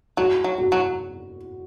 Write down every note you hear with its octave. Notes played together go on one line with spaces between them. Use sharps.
F#3 F#4
F#3
F#4
F#3